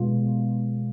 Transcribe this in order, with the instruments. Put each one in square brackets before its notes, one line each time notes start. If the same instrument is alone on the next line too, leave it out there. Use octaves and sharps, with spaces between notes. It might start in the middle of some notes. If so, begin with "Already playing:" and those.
Already playing: [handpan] B2 G#3 B3 F4